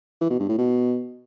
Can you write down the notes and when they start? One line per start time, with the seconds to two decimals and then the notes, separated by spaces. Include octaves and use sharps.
0.21 E3
0.30 B2
0.40 G2
0.49 A2
0.58 B2